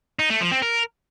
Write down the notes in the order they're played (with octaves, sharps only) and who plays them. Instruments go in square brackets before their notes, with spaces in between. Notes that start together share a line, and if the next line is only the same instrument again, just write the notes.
[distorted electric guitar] D#4
A3
F3
C4
A#4